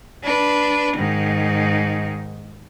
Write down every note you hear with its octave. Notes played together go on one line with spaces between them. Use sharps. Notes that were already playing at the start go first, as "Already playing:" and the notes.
D4 B4
G#2 D#3